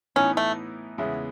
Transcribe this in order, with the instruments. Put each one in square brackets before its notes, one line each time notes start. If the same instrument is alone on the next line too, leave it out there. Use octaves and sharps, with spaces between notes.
[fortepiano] A2 E3 B3 D#4 [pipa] C#4
[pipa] A3
[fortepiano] E2 C#3 G#3 B3 E4